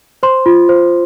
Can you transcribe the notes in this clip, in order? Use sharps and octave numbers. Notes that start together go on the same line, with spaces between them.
C5 C6
F4
C5